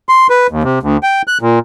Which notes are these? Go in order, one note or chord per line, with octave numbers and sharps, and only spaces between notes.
C6
B4
D#2
C3
D2
G5
F#6
A#2